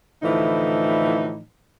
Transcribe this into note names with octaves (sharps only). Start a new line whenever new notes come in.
A2 D3 E3 F3 D#4